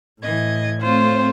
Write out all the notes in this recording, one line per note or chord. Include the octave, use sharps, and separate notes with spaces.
A2 E3 D#5 G#6
A3 C4 F4 C5 C#5